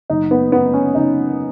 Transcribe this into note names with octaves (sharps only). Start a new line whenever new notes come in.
F#1 D#4
B3
F#2 B3
C#4
C#3 D#4